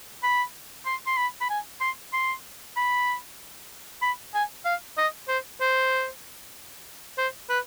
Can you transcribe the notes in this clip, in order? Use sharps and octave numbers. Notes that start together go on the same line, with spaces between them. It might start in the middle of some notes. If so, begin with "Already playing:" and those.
B5
C6
C6
B5
B5
G#5
C6
C6
B5
B5
G#5
F5
D#5
C5
C5
C5
B4